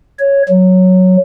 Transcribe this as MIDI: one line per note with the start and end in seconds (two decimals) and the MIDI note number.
0.19 0.42 73
0.49 1.17 54